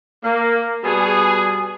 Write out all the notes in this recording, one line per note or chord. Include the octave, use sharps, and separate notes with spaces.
A#3
B2 G3 B3 G#4